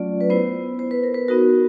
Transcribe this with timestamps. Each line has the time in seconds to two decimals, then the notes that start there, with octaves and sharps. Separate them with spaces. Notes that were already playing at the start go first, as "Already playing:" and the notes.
Already playing: F#3 A3 C#4 F4 D5
0.21 B4
0.30 B3 E4 C5
0.79 C5
0.91 B4
1.03 A#4
1.14 B4
1.28 B3 D#4 F#4 A#4